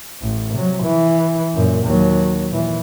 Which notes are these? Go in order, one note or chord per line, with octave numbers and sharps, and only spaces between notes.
A1
C3 F#3
E3
F#2 A#2
D#2 F#3
A#2 E3